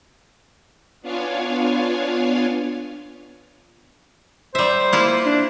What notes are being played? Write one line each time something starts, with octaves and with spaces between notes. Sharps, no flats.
B3 D4 F4 C#5 F5 G#5
G3 C5 E5
A#3 E4 F4
D4